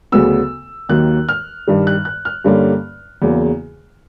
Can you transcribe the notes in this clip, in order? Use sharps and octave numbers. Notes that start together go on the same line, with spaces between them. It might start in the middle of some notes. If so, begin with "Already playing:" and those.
D2 C#3 F#3 B3 E6
D#2 D#3 F#3 A#3 F#6
F6
G2 D#3 G3
F#6
F#6
F6
G2 D3 G3 A#3 C#4
E2 C#3 F#3 A#3